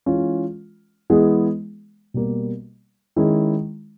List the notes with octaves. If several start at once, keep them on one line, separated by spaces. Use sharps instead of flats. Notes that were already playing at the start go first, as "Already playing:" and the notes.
E3 G#3 C#4 F4
E3 G#3 B3 E4 G#4
B2 G3 A#3
D#3 G#3 C#4 E4